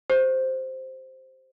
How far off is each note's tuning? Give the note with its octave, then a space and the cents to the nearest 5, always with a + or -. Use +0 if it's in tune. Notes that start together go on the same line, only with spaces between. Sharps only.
G4 +0 C5 +0